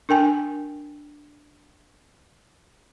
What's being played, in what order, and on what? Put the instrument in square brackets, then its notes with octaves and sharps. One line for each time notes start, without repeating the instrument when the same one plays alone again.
[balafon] D4 A#4 G5 G#5